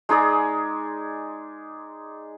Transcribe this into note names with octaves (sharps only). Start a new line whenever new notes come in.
G#3 D#4 G#4 D5